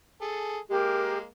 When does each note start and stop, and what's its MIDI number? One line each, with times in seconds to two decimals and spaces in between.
0.22 0.58 68
0.22 0.58 69
0.71 1.27 56
0.71 1.27 58
0.71 1.18 67
0.71 1.18 70